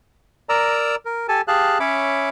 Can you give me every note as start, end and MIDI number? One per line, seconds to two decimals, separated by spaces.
0.49 0.95 70
0.49 0.95 74
0.49 0.95 82
0.49 0.95 88
1.05 1.27 70
1.28 1.41 67
1.28 1.41 69
1.28 1.41 80
1.28 1.41 81
1.48 1.78 67
1.48 1.78 68
1.48 1.78 77
1.48 1.78 81
1.48 1.78 90
1.80 2.29 61
1.80 2.29 73
1.80 2.29 76
1.80 2.29 83
1.80 2.29 86